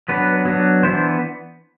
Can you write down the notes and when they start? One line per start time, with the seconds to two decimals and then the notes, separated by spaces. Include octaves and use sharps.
0.08 F#3 B3 D4 B4
0.45 F#3 B3 D4
0.83 E3 B3 D4 C5